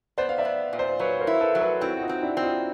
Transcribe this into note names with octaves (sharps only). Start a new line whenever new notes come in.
B3 C5 D5
F5
D5 E5
B3
A#2
C5 D5
F#3 B4 C#5
A#4 C5
E4
A4 B4
F#3
A4 B4
C4 E4 F#4
F#4
D#4 F4
C4
D4 E4
C4
D#4 F4